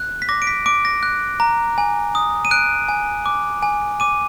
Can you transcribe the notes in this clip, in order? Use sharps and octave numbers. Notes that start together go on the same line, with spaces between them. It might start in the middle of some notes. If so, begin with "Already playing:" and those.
Already playing: F#6
B6
D6 A#6
D7
B6
D6 D7
A#6
F#6
A#5
G#5
D#6
D#7
F#6 D7
G#5
D6
G#5
D6 D#7